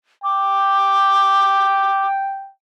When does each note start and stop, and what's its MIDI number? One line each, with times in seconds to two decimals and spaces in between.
0.24 2.51 79
0.24 2.07 86